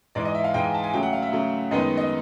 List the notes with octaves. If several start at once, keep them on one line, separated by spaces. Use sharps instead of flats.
G#2 E3 G#3 D5
D#5
E5
F5
G#2 E3 G#3 G5
G#5
A5
G#5
C#3 F#3 A3 G5
F#5
F5
E5
C#3 F#3 A3
F#2 D#3 G#3 B3 D#4 D#5
D#5